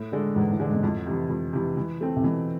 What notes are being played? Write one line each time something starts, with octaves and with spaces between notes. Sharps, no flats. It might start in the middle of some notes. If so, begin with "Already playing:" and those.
Already playing: A2
D3 G#3 D4 A4
E2 G#2
A2
D3 G#3 D4 A4
G#2
B2
F2 A2
C3 E3
F2
C3 E3
E3
A3 C4
C3
B2 E3